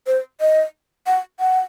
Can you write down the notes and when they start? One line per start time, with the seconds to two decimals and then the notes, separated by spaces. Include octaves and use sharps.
0.07 C5
0.41 D#5
1.07 F#5
1.40 F#5